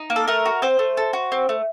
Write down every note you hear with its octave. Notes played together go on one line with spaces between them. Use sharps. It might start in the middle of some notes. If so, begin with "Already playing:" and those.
Already playing: D#4
A#3
A4
A3 A#4
F#4
C4 C5
A3
A4
F#4
C4
A3